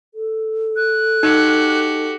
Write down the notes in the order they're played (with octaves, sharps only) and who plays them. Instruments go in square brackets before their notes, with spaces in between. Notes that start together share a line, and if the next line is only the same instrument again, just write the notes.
[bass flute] A4
[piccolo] F#6
[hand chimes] D#4 [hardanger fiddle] F#4 G4